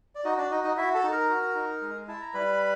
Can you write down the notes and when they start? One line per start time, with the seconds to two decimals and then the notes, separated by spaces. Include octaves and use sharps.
0.15 D5
0.24 D#4 F#4 D#5
0.38 D4 D5
0.51 D#4 D#5
0.64 D#4 D#5
0.77 E4 F#4 E5
0.94 A4 A5
1.04 D#4
1.12 A#4 A#5
1.29 F#4
1.55 D#4
1.81 G#3
2.08 E4 A5
2.21 A#5
2.34 G3 B4 B5